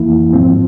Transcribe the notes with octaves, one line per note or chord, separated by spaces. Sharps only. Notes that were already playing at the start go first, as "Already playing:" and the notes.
Already playing: F2 E3 A#3 E4
G#2 F3 C4